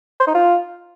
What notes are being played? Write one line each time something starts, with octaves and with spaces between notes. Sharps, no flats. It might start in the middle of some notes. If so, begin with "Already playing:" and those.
C5
D#4
F4